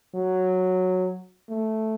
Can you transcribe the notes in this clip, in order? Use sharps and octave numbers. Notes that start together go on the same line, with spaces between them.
F#3
A3